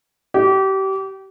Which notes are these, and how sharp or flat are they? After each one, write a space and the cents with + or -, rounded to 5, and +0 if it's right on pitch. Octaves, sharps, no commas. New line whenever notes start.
G4 -30